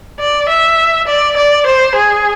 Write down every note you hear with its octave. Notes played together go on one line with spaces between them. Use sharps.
D5
E5
D5
D5
C5
G#4